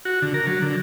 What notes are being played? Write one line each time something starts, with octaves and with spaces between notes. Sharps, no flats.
F#4
D3
A#4
F#3
D3